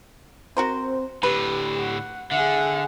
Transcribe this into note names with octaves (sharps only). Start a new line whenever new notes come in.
C4 F#4 A#4 C5
A2 D3 G4 B4
F#5
D3 G#4 E5 F#5